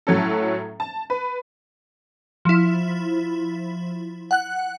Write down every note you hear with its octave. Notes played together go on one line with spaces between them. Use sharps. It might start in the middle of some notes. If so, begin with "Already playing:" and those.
A2 F#3 C#4 A4
A5
B4
F3 E4
F#5 F#6